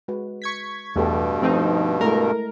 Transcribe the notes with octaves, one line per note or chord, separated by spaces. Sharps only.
G#3 F#4 B4
C#6 G#6 B6
E2 G2 B2 A3 G4 A4
F3 A3 C4 D#4 F#4
G#3 A3 E4 A#4